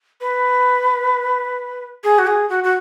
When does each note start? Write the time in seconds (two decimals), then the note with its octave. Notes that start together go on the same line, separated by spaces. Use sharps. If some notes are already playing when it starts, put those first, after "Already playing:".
0.21 B4
2.04 G#4
2.18 F#4
2.27 G#4
2.49 F#4
2.64 F#4